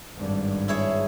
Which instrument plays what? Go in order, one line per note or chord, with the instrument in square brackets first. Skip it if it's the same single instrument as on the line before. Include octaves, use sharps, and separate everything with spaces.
[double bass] G#1 G2
[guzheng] E4 G#4 C#5